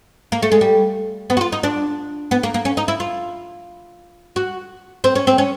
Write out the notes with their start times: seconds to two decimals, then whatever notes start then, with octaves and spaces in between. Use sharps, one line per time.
0.32 A#3
0.43 A3
0.52 G#3
0.61 G3
1.30 B3
1.37 F#4
1.41 F4
1.52 D#4
1.63 D4
2.31 B3
2.43 A#3
2.54 A#3
2.65 C#4
2.77 D#4
2.88 E4
3.00 F4
4.36 F#4
5.04 C4
5.15 C#4
5.27 C4
5.38 C#4